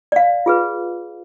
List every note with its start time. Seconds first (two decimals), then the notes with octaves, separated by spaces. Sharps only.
0.12 D5
0.16 F5
0.46 F4 G#4 B4